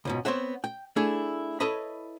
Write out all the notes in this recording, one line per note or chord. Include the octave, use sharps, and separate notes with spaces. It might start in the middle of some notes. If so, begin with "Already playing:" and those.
C#2 G#2 B2
B3 C4 C5 C#5 E5 F#5
G5
A3 D4 E4 G#4
E4 A4 B4 C#5 D#5 B5